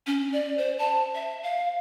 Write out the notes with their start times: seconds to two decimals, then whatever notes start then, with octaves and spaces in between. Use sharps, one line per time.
0.07 C#4
0.33 D5
0.58 C5
0.79 A5
1.15 E5
1.43 F5